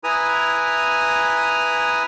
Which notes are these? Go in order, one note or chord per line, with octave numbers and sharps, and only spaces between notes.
E4 B4 G#5 A#5 D#6